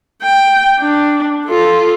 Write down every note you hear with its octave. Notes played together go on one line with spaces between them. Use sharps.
G5
D4
F4 A4